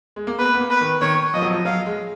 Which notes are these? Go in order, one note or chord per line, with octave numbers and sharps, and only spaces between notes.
G#3
A#3
B3 B4
B3
A#3
B4
D#3
D#3 C#5
F3 D#5
F#3
F3
F#3 F5
G#3